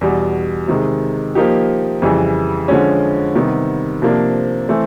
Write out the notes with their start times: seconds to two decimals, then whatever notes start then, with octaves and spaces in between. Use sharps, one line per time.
0.01 E2 B2 G3
0.68 C3 D#3 G#3
1.35 F3 A#3 D#4 G4
2.02 F2 C#3 E3 G3
2.68 D3 F3 G#3 C#4
3.35 C3 D#3 G3 B3
4.02 C3 F3 A#3 D4
4.69 E3 A3 C4